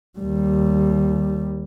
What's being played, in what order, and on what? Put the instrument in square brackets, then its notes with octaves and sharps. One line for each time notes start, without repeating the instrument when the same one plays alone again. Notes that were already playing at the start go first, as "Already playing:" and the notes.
[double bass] D#2 G3